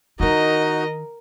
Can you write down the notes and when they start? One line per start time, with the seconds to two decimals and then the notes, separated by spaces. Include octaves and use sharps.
0.20 D#3 D#4 E4 F#4 A#4 D#5